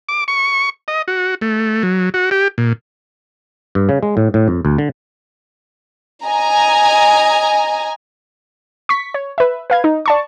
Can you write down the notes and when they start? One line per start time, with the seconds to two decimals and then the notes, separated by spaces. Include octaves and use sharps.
0.09 D6
0.28 C#6
0.88 D#5
1.08 F#4
1.41 A3
1.83 F#3
2.14 F#4
2.31 G4
2.58 A#2
3.75 G2
3.89 C#3
4.03 G#3
4.17 A2
4.34 A2
4.48 F2
4.65 D2
4.78 D3
6.24 D#5 G#5 A#5
8.89 C#6 B6
9.14 C#5
9.38 B4 E5
9.70 B4 F5 G#6
9.84 D#4
10.06 D5 A5 C#6